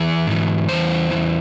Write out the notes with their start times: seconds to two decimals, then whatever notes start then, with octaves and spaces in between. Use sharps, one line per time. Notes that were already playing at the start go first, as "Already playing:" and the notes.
Already playing: E3 G#4
0.27 G#2 E3
0.69 E2 E3 C5
1.11 E2 E3